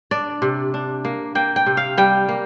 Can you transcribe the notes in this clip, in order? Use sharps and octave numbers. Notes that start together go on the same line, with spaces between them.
D4 D5
C3
D4
A#3
A#3 G5
G5
C3
F5
G3 G5
A#3